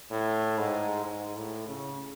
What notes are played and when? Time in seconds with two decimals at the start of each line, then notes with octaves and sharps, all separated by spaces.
0.11 A2
0.58 G#2
1.05 G#2
1.37 A2
1.68 C#3